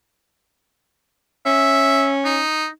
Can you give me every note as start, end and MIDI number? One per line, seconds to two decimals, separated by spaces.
1.46 2.41 61
1.46 2.10 76
2.25 2.68 63